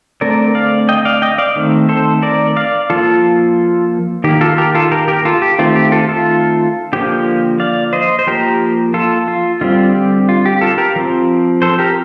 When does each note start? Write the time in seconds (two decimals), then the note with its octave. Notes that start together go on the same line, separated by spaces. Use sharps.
0.21 D3 A3 C4 A#4 D5
0.55 D5 F5
0.89 D#5 G5
1.05 D5 F5
1.22 D#5 G5
1.38 D5 F5
1.56 D#3 A3 C4
1.89 A4 C5
2.22 A#4 D5
2.56 D5 F5
2.90 F3 A#3 F4 A4
4.24 D#3 A#3 G4
4.41 F4 A4
4.58 G4 A#4
4.75 F4 A4
4.92 G4 A#4
5.08 G4 A#4
5.25 F4 A4
5.42 G4
5.59 D#3 A3 C4 F4
5.76 G4
5.92 F4 A4
6.09 F4 A4
6.93 D3 F3 A#3 G4
7.60 D5 F5
7.93 C5 D#5
8.19 C5
8.27 F3 A#3 G4 A#4
8.94 F4 A4
9.28 F4
9.61 D3 G3 C4 F4
9.95 G4
10.29 F4
10.46 G4
10.61 F4 A4
10.78 G4 A#4
10.96 F3 C4
11.62 A4 C5
11.79 G4 A#4